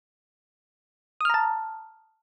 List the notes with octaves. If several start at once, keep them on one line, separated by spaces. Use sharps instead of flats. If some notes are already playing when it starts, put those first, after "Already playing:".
A5 A#5 D#6 F6